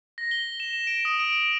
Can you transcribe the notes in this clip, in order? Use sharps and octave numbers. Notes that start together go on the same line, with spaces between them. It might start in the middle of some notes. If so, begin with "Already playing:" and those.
A#6
G7
E7
E7
D7
D#6
D7
D7